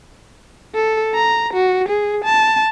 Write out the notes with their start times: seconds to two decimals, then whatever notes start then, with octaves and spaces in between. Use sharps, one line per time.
0.75 A4
1.15 A#5
1.53 F#4
1.88 G#4
2.24 A5